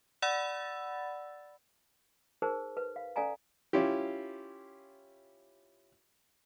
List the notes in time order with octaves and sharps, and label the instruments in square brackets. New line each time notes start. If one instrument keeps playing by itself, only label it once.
[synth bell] D5 F#5 B5 E6 A6
[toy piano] D#4 G#4 A#4 C5
B4
F5
C#4 A4 D5 F5 G#5 A#5
[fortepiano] C#4 E4 F4 G4